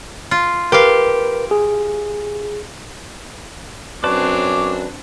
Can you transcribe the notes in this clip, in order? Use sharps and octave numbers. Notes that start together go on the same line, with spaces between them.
F4
G4 A#4 B4 F5
G#4
F#2 C4 D4 B4 C#5 D5 A5 D6